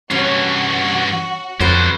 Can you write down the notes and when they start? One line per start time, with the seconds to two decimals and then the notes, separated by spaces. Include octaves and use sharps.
0.11 G2 E3 C#4 F#4 C#5
1.60 F2 D3 C#4 F#4 B4 C5